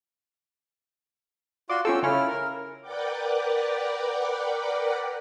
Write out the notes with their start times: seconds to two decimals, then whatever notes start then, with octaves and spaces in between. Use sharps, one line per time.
1.69 F4 F#4 D5 C6
1.85 C#4 F4 A4 G5 E6
2.03 C#3 C#4 E4 F4 F6
2.28 A#4
2.81 A#4 B4 D5 F#5 G5 D6